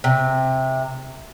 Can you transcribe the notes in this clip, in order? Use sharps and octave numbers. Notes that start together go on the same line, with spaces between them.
C3